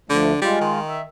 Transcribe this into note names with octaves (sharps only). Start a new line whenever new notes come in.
D2 D3 F3 A3
G3 G#3 F4
D#3
E5